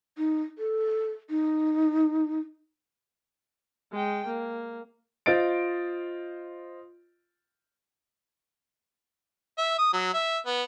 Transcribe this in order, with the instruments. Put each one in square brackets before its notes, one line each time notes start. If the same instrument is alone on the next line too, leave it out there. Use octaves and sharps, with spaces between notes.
[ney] D#4
A4
D#4
[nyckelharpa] G#3 G5
A#3
[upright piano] F4 C5 D#5 A6 D7
[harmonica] E5
D#6
F#3
E5
B3